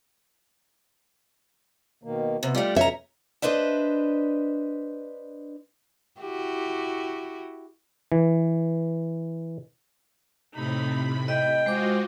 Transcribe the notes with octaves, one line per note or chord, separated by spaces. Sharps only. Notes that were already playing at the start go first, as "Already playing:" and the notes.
B2 D#3 A#3
C3 B3
G3 A3 F4 G4 D5
F2 B2 C#4 E5 A#5
D4 B4 C5 D#5 E5
E4 F#4 G4
E3
A2 C3 D#4 B5
D#5 G5
G#3 F4 F#4 C5 D#5 D6